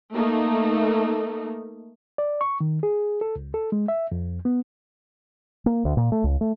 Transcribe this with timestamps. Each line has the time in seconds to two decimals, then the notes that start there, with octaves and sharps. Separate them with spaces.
0.13 A3 A#3 D#4
2.18 D5
2.41 C#6
2.61 D#3
2.83 G#4
3.21 A4
3.36 C#2
3.54 A4
3.72 G#3
3.88 E5
4.12 F2
4.45 B3
5.66 A#3
5.85 D2
5.97 A#2
6.12 A3
6.24 C#2
6.41 A3